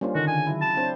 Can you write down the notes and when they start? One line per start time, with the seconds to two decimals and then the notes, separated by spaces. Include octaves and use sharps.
0.01 G3 A#3 C#4 D4 F4 C5
0.15 D3 D#3 F#4
0.28 C#3 G#5
0.47 F#3 E4
0.61 A5
0.77 C4 D4 C5